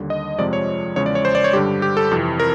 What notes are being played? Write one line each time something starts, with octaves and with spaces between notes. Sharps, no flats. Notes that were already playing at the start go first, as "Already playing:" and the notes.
Already playing: D#2 D3 G3
D#5
F2 C3 F3 G#3 D5
C#5
E2 C#3 F3 G#3 C#5
D5
C#5
C5
D5
C#5
G2 D3 G3 G4
G4
A4
F2 C3 E3
A#4